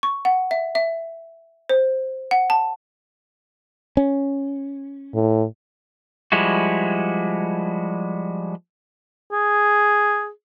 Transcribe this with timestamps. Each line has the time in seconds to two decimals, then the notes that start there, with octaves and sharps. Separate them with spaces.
0.03 C#6
0.25 F#5
0.51 E5
0.75 E5
1.69 C5
2.31 F#5
2.50 A5
3.97 C#4
5.14 A2
6.32 F3 G3 G#3 E4 F#4
9.32 G#4